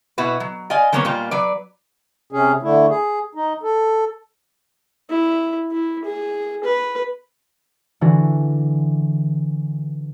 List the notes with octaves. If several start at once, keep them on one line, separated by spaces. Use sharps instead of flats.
B2 E4 F#4 B4
F#3
D5 D#5 F5 G#5
D#3 F#3 A#3 B3 C#4 C#5
A#2 G3 A#3 F4
F#3 B4 D5
C3 C#4 G#4
D3 A3 E4
G#4
D#4
A4
E4
E4
G#4
B4
D3 E3 D4 F#4